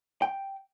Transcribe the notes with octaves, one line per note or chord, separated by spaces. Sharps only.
G5